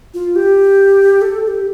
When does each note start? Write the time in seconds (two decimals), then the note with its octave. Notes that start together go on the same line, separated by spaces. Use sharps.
0.14 F4
0.36 G4
1.22 A4
1.43 A4
1.48 G4